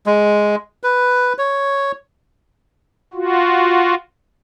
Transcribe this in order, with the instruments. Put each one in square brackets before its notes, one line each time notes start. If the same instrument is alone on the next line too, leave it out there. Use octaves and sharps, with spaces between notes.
[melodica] G#3
B4
C#5
[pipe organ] F4 F#4